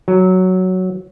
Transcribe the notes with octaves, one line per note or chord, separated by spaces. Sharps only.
F#3